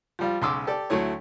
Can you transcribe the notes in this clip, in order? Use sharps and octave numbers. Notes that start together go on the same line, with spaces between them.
F3 G3 F4
B1 C#3 C6 D6 E6
G4 A4 D5
D2 F#3 A3 E4 C#5